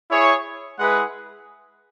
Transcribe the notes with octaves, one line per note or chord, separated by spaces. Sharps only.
E4 G#4 C#5
G#3 E4 G#4 B4 F#5